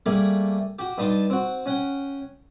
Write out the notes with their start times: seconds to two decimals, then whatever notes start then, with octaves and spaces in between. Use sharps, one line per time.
0.06 G3 A3 A#3 G4 G#4
0.79 F#4 G4
0.98 G2 D#4 A5 C6 D6
1.30 C4 F#4
1.66 C#4 F#5 G5